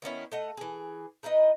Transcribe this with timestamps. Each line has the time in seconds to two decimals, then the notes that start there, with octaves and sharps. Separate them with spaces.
0.02 D#3 B3 C#4 E4
0.32 A3 D#5 F#5
0.57 E3 G#4
1.23 D#4 E4 B4 D#5